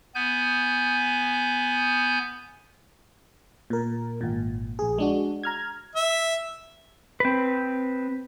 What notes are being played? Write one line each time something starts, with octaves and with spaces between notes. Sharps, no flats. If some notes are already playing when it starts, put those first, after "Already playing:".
B3 G#5 G6
A#2 A#4
G#1 A#2
A#1 G#4
G#3 D4 F#4
A#5 F6 G#6
E5
C4 B4